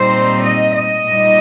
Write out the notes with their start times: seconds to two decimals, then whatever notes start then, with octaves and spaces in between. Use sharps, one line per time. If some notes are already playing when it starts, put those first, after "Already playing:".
Already playing: A#2 G3 C4 D#4 C5
0.43 D#5
0.75 D#5
1.06 A#2 G3 D#4